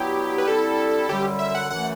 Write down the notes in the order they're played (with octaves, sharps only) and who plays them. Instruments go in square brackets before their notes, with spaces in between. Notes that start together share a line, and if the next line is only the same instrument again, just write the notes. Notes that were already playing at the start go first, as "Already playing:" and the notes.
Already playing: [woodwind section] G2 F#3 B3 E4 [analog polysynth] G4
[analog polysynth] B4
[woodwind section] D3 G3 C4 E4 [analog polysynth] A4
[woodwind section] F#2 D3 G3 [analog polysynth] G4
[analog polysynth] E5
F#5
[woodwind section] F#2 E3 A3 [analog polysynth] F#5